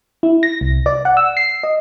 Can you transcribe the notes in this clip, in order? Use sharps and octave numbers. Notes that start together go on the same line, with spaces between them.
E4
A#6
C2
D5
F#5
E6
C7
D#5